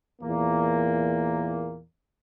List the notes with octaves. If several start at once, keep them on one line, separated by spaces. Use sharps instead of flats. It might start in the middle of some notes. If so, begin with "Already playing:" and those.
E2 A#2 A#3